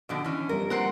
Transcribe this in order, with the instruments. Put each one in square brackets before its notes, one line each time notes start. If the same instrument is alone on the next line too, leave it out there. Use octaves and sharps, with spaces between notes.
[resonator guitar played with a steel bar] F2 B2 D3 [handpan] D4 D5 D#5
[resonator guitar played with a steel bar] E3 C#4
[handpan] F3 G3 B3 [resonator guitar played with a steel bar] A#4
[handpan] A#3 [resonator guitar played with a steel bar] C4 C5 [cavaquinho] A#4 F#5 C6